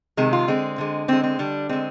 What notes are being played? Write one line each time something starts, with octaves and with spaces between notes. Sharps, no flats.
C3 D#3 G#3
F4
D3 G#3 C4
D3 G#3
D3 G#3 C4
C4
D3 G3 D4
D3 G#3 C4